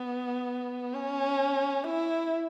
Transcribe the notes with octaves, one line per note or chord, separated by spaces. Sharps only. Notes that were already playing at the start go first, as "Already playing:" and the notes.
Already playing: B3
C#4
E4